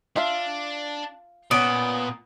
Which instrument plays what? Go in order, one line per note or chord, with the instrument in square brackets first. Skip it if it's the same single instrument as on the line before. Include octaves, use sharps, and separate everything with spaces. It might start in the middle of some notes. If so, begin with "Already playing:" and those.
[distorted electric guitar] D4 [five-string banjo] F4 E5 F5
[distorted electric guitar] A#2 [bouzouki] B3 [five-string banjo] C#4 D5 [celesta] D#6 D7